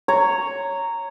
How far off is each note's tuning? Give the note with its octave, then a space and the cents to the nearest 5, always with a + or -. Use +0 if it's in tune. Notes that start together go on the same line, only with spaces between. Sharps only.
C#5 +0 A#5 -10